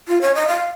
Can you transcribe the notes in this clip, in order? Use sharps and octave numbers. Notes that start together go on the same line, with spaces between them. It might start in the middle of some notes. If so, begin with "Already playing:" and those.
F4
C#5
D#5
F5